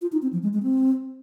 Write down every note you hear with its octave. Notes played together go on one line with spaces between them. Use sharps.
F4
D#4
C4
F3
G#3
G#3
C4